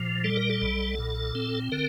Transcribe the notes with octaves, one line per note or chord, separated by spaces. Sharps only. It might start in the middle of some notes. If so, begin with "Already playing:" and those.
Already playing: A#2 F3
G3 A4
A#4
A4
B1
A#2
C4
D3 A#4